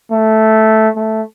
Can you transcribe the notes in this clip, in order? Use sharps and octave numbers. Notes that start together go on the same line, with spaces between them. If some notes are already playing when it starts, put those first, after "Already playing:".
A3
A3